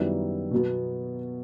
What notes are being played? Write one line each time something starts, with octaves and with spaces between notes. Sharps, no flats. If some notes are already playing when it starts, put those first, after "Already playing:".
Already playing: F#2 D#3 G3 B3 E4
B2 F#3 B3